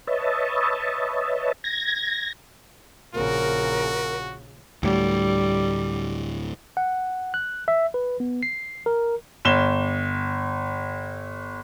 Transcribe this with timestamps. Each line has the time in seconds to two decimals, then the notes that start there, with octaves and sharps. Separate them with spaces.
0.07 B4 C#5 D#5 E5 A5
1.64 G#6 A#6
3.14 A#1 C#3 F#4 A#4
4.83 D2 A2 G3
6.77 F#5
7.34 F#6
7.68 E5
7.94 B4
8.20 B3
8.43 C7
8.86 A#4
9.45 G1 E7 G7